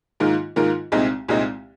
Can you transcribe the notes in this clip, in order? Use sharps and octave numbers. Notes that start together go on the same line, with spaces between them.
G#2 D#3 A#3 F4 A#4
G#2 D#3 A#3 F4 A#4
C2 A#2 G#3 C4 D#4
C2 A#2 G#3 C4 D#4